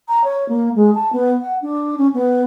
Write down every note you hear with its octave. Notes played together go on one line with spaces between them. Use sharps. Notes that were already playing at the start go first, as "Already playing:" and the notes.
A#5
C#5
A#3
G#3
A5
B3
F#5
D4
C#4
B3